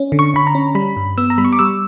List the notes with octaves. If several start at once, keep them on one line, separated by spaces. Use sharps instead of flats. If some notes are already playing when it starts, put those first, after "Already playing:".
Already playing: C#4
D3
C#6
D3 B5
A#5
C#4
G3 B5
G2
B3 E6
A#5
G3 B5
C#6
D6
G3 E6